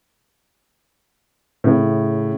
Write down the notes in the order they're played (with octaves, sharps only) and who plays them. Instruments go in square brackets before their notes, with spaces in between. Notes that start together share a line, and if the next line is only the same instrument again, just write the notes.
[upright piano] A2 C#3